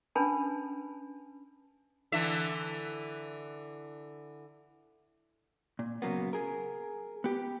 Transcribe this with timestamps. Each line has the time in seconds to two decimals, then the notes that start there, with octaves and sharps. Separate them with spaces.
0.15 C#4 D4 B4 G#5 A5 B5
2.12 D3 E3 E5
5.79 A#2
6.02 C#3 F#3 A#3 B3
6.33 G#4 A#4
7.24 B3 G4